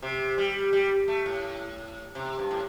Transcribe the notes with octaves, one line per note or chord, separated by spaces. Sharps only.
C3
G3
G3
A3
A2
C3
G2
A2